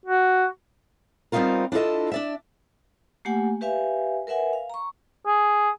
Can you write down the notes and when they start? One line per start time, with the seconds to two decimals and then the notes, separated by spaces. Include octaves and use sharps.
0.05 F#4
1.32 G3 B3 C4 D#4 F4 A#4
1.72 D4 E4 F4 A4 D#5
2.12 D4 D5 E5
3.25 A3 A#3 G4 F#5 G#5
3.61 G4 B4 E5 F5 G#5
4.27 A#4 B4 E5 F#5 G#5
4.53 F5
4.70 A#5 C#6
5.27 G#4